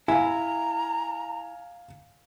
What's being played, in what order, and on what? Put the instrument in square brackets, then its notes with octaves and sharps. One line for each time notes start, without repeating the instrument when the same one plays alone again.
[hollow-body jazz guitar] E4 [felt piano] F5 G#5 [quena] A#5